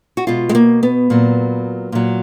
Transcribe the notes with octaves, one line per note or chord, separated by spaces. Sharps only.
F#4
B2 G#3 F4
G#3
A#3
B3
A#2 F#3
A#2 F#3